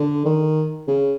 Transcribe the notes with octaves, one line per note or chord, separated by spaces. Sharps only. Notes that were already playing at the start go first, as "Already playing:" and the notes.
Already playing: D3
D#3
C#3